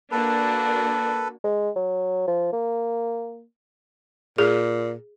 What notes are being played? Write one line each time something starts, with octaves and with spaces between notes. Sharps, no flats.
A#3 D4 F#4 A4 B4
G#3
F#3
F3
A#3
A#2 G#4